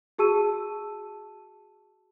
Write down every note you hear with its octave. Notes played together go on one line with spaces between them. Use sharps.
F#4 G#4 A5 E6 D#7